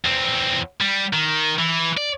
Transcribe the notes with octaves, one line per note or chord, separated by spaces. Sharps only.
E2 C4
G3
D#3
E3
D5